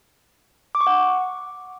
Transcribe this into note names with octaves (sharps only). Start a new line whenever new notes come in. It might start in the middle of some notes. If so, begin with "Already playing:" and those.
D6
C#6
F#5